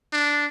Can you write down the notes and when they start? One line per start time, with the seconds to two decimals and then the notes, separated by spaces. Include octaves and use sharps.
0.13 D4